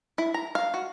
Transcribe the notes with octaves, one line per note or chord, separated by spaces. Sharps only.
E4
A#5
F5
F#4